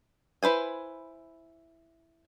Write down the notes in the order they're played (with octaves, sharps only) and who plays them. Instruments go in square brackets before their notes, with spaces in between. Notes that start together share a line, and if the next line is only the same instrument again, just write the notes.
[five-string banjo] E4 B4 C5 G#5